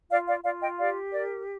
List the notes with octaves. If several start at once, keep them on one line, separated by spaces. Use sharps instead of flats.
F4 D5 F5
D5 F5
F4 D5 F5
D#5 G5
G4 D5 F5
A#4 D5